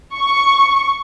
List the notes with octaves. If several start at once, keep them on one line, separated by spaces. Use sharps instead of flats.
C#6